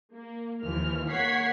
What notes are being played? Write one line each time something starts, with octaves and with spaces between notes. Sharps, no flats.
A#3
D#2 E3 F3 F6
A#3 C#5 F#5 G#6 B6 C7